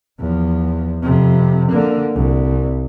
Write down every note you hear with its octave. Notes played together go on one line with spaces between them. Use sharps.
E2 F3
F2 C3
D3 A#3
C2